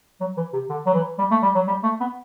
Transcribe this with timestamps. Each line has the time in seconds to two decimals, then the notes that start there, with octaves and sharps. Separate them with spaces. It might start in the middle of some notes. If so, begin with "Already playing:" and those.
0.20 F#3
0.37 E3
0.53 C3
0.69 D3
0.86 F#3
0.94 E3
1.18 G3
1.31 A3
1.42 G3
1.55 F#3
1.67 G3
1.83 A3
2.00 B3